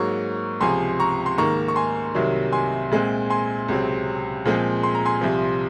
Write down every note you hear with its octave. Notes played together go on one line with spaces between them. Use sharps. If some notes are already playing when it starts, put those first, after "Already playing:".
Already playing: G#2 F#3 A#3 A#5 C#6
C#2 C3 F3 G#5 C6
A#5 C#6
C6
G#2 D#3 A#3 A#5 C#6
C#6
G#5 C6
C2 C3 D#3 F#3
G#5 C6
A#2 G#3 C4
G#5 C6
C#2 C3 F#3 C4
A#2 F3 G#3 C4
C6
A#5
G#5 C6
C2 C3 F3